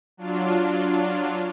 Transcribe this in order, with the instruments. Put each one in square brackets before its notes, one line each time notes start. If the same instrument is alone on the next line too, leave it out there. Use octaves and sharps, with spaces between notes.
[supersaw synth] F#3 D4 F4